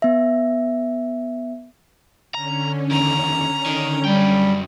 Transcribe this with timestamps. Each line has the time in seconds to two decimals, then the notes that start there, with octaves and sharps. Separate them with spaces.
0.02 B3 E5
2.35 D3 C#4 A#5
2.91 E2 D#3 A#5
3.66 D#3
4.05 F#2 G3 G5